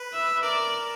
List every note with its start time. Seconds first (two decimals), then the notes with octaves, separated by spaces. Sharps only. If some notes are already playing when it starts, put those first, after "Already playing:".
Already playing: B4
0.13 E5
0.43 A#4 D5